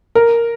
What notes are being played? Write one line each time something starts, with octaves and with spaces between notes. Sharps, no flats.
A#4